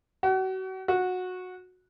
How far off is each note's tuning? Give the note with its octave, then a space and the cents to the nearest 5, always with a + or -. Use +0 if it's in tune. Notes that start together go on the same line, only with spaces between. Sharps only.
F#4 +35
F#4 -15